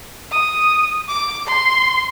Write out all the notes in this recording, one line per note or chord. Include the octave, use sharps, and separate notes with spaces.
D#6
D6
C6